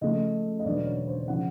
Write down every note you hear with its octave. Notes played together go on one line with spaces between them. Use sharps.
C#2 C#3 F3 A3 C#4 D#5
D#5
E1 D2 D3 F#3 B3 D5
C#5
C5
C#3 F3 F#5